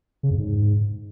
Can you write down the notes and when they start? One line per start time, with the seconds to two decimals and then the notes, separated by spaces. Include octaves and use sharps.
0.23 C#3
0.31 F#2
0.38 G#2